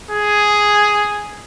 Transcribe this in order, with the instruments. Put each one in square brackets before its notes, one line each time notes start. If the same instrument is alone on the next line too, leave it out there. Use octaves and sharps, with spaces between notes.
[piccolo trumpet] G#4